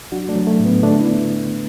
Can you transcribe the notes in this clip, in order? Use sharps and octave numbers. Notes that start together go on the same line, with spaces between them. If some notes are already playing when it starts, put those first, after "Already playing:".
F#3 D4 F#4
A3 D4
F#3
A3
A2
B3
D3 A3 D4
B3 E4